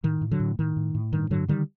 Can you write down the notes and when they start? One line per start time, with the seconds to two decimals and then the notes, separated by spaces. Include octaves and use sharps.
0.04 A2 D#3
0.21 A2
0.31 D3 F#3
0.40 A2
0.59 A2 D#3
0.77 A2
0.95 A2
1.12 G2 D#3
1.30 G2 D3 F#3
1.48 D3 D#3 G3